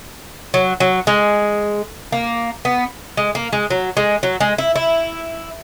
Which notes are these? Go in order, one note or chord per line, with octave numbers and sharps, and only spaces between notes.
F#3
F#3
G#3
A#3
B3
G#3
A#3
G#3
F#3
G#3
F#3
G#3
E4
E4